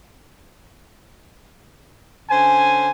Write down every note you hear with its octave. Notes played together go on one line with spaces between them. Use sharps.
D3 C#4 C5 G#5